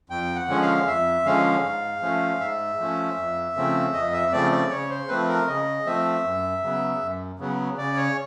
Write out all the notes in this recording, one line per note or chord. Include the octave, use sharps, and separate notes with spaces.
F2 G5
F#5
D3 F3 G#3 C#4
F5
F2 E5
D3 F3 G#3 C#4 F5
G#2
F3 A3 C#4
G#2 E5
F3 A3 C#4
F2
C#3 F3 A3 C4
F2 D#5
E5
C#3 F3 A3 C4 D5
D5
C#3 C#5
C5
F3 A3 C4 B4
A#4
C#3 D#5
F3 A3 C4 E5
F#2
C#3 F#3 B3
F#2
C#3 F#3 B3
C#3 D5
C#5